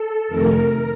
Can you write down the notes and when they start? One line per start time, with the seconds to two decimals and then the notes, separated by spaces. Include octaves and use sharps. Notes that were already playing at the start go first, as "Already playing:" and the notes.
Already playing: A4
0.28 F2 C3 D#3 A3 A#4